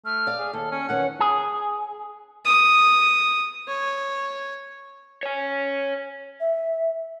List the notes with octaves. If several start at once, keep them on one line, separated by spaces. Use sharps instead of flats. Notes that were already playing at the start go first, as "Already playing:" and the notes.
A3 F6
D5 F5
G#4
D#2 A4
C#4 C#7
E2 D#3 C#4 F#5
G#4
D#6
C#5
C#5 G#5
E5